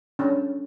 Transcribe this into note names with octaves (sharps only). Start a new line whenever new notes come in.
C#4 D4